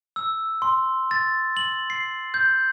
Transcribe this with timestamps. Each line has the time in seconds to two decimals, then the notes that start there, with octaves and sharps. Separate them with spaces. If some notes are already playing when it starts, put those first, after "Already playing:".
0.16 E6
0.62 C6
1.11 A6
1.57 F#7
1.90 C7
2.34 G6